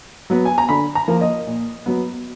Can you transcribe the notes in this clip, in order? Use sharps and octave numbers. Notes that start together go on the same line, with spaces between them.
F#3 B3
G#5
A#5
D3 B5
A#5
F3 A#3
D#5
A#2
F#3 B3